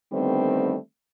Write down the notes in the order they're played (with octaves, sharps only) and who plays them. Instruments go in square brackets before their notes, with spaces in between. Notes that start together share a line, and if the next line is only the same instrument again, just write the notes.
[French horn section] D3 D#3 G3 A3 B3 C4